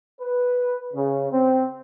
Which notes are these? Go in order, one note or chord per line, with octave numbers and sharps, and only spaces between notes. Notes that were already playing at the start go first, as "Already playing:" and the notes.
B4
C#3
C4